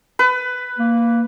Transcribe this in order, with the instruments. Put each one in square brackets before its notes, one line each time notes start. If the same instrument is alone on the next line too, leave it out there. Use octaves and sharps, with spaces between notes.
[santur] B4
[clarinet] A#3